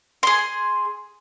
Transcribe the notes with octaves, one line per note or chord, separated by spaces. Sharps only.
G#4 C6